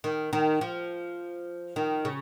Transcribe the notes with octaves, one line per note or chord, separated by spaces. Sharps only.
D#3
D#3
F3
D#3
C#3